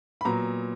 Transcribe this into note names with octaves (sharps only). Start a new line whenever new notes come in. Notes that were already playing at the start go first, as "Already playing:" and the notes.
B5
A#2 F#3 B3 A#5